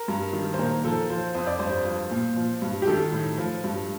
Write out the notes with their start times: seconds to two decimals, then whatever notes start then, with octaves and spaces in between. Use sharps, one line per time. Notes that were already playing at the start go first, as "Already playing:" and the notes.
Already playing: A#4
0.08 G2
0.33 D#3
0.54 C5
0.58 A#2 A#4
0.85 F3 A4
1.10 F3 C5
1.35 F2 C5
1.47 D5
1.59 G2 C5
1.85 F3
2.11 A#2
2.36 F3
2.62 G2
2.82 G4
2.87 D#3 A4
3.12 A2
3.38 F3
3.64 G2